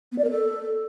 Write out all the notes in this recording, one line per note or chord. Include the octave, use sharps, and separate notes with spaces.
B3
D5
A#4
A4